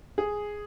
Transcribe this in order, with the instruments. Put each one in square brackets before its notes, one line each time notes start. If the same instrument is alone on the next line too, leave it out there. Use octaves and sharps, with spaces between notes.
[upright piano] G#4